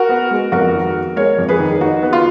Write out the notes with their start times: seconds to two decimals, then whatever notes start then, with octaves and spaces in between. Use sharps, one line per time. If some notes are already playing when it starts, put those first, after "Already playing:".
Already playing: F#4 A#4
0.09 B3
0.31 G#3
0.52 F2 F#4 A#4
0.74 D#3
0.95 B3
1.16 G#3 A#4 C#5
1.38 F2
1.49 G#4 B4
1.59 D#3
1.81 D#4 F#4
2.02 B3
2.13 F4